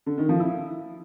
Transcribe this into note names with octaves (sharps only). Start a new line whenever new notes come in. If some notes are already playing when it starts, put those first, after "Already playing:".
D3
D#3
F3
E4